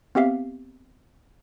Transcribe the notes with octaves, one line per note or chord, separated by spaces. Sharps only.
B3 C4 G4 E5 F5